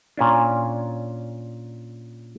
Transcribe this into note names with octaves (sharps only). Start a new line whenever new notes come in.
A#2 C#4 D4